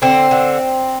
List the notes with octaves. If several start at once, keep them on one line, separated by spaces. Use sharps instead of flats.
D3 C4
D3